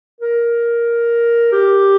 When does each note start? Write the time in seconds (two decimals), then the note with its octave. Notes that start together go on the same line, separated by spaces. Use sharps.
0.21 A#4
1.52 G4